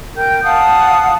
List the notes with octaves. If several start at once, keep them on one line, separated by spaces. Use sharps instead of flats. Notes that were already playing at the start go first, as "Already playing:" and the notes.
A#4 G5 G6
F5 F#5 A5 D#6